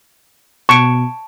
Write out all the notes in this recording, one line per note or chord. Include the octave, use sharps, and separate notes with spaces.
B2 A5 C#6 D7